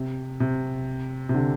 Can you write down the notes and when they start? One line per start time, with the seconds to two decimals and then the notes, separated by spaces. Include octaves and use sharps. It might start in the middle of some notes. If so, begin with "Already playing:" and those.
Already playing: C3
0.40 C3
1.29 C3
1.34 D3